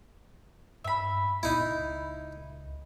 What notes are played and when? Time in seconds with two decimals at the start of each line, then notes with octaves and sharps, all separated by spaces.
0.84 G2 E5 B5
1.43 C#2 D#4 E4